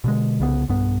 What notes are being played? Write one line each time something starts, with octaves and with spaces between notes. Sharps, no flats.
B2 D3 G#3
C2 C#3 B3
B1 G2 B3